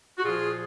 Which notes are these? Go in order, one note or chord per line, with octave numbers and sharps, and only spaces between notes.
F#4
A#2 F3 F4 G#4